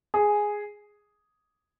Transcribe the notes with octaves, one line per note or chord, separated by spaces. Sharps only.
G#4